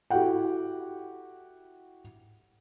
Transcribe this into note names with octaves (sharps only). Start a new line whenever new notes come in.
E4 F#4 G4 A4 F#5 G5